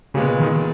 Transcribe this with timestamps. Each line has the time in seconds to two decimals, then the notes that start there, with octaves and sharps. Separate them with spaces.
0.14 A#2 C#3 G#3 B3
0.40 D#3